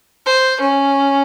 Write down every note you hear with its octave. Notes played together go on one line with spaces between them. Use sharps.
C5
C#4